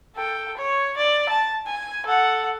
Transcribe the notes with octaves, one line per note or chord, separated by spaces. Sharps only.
A4 G5
C#5
D5
A5
G#5
A4 F#5